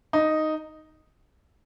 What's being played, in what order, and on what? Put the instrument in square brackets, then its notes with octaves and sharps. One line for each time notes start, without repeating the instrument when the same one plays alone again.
[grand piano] D#4